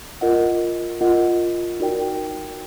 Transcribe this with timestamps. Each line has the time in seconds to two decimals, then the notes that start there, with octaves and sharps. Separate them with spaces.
0.21 F4 A#4 D#5 F#5
1.01 F4 A#4 D#5 F#5
1.80 D#4 F#4 A#4 D5 G5